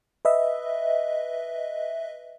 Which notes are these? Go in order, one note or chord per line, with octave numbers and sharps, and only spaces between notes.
B4 D#5 E5